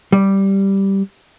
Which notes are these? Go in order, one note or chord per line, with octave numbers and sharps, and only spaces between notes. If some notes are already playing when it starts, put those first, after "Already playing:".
G3